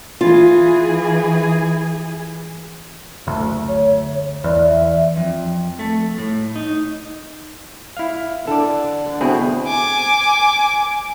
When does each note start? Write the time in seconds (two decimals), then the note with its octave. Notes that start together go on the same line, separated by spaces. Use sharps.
0.21 E3 F4 G#4
3.26 F#1 D2
3.68 C#5
4.44 E2 D5
4.69 E5
5.17 F2
5.79 A3
6.18 A2
6.56 D#4
7.97 E4 F5
8.47 D3 A4 D5
9.21 B2 C4 E4 G#4
9.67 G#5 D6